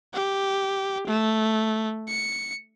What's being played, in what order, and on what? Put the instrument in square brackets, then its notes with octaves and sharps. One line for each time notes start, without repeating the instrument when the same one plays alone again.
[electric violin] G4
A3
C#7